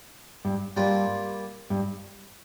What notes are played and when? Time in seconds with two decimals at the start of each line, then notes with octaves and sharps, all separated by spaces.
0.45 G2
0.76 G2 G3 A#3 F4
1.70 G2